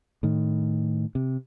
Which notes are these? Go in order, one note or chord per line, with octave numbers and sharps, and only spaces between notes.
A2 D#3
C3